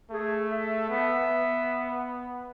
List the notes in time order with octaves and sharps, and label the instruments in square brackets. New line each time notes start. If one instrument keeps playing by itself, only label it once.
[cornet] A3 [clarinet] G#4
[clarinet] E5
[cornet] B3
B3